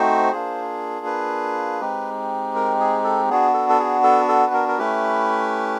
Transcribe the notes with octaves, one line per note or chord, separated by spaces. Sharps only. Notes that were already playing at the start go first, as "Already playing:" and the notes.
Already playing: A3 C4 D#4 F#4 C5
A#3 D4 F4 G#4
B4
G#3 C4 D#4 G4
A#4
G#4
A4
B3 D4 F#4 G#4
A4
A4
G#4
A4
A4
B4
A#4
A#4
A3 C#4 E4 G4 B4